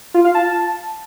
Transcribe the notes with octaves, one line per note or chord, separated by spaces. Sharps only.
F4
F5
A5